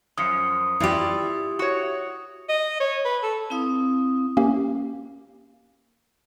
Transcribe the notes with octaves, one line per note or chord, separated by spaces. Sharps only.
F#2 F3 D#6 C#7
E3 E4 F4 G4 D5
F#4 C#5
D#5
C#5
B4
A4
C4 E4 F5 D#6
A#3 C#4 G4